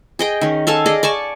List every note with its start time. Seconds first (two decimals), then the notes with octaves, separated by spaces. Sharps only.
0.19 G#4 D#5 G5
0.41 D#3 C#4
0.67 A4 F5 G#5 A5
0.86 G#4 D5 D#5
1.03 D5 G#5 A5 C#6